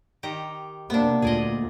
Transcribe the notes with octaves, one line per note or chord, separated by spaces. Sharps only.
D#3 G4 A#5
C3 A#3 B3 D4
D2 A#2 G#4 D5 D#5